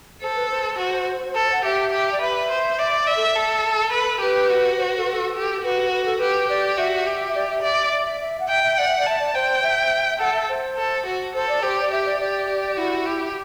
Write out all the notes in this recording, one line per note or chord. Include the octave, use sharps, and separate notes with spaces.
A4 C5
B4
C5
F#4
A4
F#5
G4 E5
G4
D5
B4 E5
C5
D5
D5 E5
A4
A4
A4 B4
G4 B4
F#4
C5
B4
A4
B4
A4
G4
F#4 B4
B4
A4
G4 B4
G4 D5
F#4 E5
G4
D5
E5
D5 E5
D5
E5
E5
F#5
E5 G5
E5
D5 F#5
E5
D5
E5 A5
D5
C5 G5
E5
A4 F#5
E5
C5
A4
F#4
A4 C5
D5
G4 C5
D5
G4 E5
D5
G4 D5
G4
E4 F#4
G4